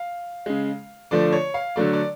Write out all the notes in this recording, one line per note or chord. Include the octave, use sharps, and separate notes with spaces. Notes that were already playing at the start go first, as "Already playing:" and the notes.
Already playing: F5
C#3 G#3
D3 F3 A3 D5
C#5
F5
D3 F#3 A3 D5
D5